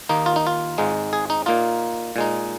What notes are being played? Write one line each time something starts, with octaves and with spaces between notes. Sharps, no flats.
D#2 D#3 A#3 D#4
F4
D#4
F4
G#1 G#2 G#3 D#4
G#4
D#4
A#2 A#3 D#4 F4
A#2 G#3 D#4